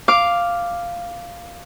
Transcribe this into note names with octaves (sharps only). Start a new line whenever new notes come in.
F5 D6